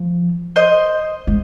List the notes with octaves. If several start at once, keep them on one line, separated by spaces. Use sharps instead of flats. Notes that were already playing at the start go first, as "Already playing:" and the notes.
Already playing: F3
C5 D#5
G#3